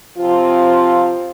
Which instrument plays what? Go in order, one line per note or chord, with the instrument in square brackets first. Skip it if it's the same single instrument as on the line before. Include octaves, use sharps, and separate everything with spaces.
[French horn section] C3 F3 C4 F4